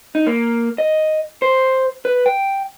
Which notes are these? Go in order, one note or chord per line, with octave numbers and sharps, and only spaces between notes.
D#4
A#3
D#5
C5
B4
G5